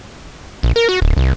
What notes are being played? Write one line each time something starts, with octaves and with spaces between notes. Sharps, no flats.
A#1
A#4
F#4
D1
C2